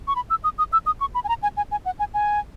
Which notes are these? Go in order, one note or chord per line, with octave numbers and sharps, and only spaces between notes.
C#6
B5
E6
D#6
D#6
E6
D#6
C#6
B5
G#5
A#5
G#5
G#5
G#5
F#5
G#5
G#5